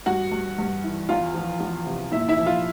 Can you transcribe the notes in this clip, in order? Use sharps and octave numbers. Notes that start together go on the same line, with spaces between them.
G2 F#4 F#5
G2
G2
E3
E2 F4 F5
F3
E2
C3
A#2 E4 E5
E4 E5
F3
F4 F5